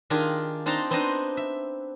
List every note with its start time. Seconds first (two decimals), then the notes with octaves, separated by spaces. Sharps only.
0.10 D#3 D4 F4 G4 G#4 G#5
0.66 C4 D4 D#4 C5 A5 A#5
0.91 B3 C4 D4 D#4 C5 D#5
1.37 E5